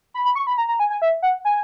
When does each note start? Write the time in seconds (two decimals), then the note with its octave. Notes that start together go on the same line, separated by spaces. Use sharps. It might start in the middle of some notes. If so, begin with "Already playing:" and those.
0.14 B5
0.25 B5
0.35 C#6
0.47 B5
0.58 A#5
0.68 A#5
0.80 G#5
0.90 G#5
1.02 E5
1.22 F#5
1.45 G#5